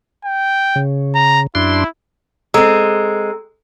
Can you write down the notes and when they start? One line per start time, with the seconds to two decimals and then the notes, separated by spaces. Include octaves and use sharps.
0.25 G5
0.76 C#3
1.15 A#5
1.55 F#2 D4 E4 C6
2.54 G#3 C4 A4 A#5 E6